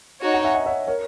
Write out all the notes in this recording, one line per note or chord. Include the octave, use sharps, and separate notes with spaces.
D#4 F#4 C#5
F#5 A#5
E5 G#5
D#5 F#5
C#5 E5
A#4 C#5